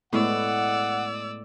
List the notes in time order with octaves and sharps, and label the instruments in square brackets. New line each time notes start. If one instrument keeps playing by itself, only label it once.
[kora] A2 [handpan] G#3 A3 B3 [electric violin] D5 E6 [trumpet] F#5